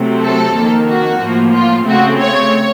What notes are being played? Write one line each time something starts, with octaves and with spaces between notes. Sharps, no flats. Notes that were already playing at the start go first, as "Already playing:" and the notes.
Already playing: C3 F#3 A3 C4
A4
F2 D#3 A#3
F#4
A2 F3 A#3
F4
C#3 A3 C4 F#4
C#5